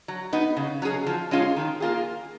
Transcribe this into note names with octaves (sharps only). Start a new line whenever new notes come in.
F#3
B3 D#4
C#3
F#3 C#4 G#4
F3
G#3 C#4 F4 G#4
D#3
A#3 F4 G#4